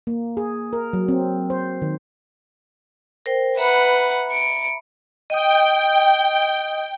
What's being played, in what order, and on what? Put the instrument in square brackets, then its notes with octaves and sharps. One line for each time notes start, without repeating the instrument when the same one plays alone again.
[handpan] A#3
G#4
A#4
F#3
C4
C5
D#3
[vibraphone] A#4 C5 G5
[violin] B4 F#5 [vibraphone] E5 A#5 B5
[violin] C#7 D7
[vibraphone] D#5 D#6 [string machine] G5